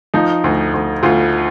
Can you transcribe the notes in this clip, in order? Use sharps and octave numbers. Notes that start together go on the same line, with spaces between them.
F3 D#4
D2
D2
D2 F4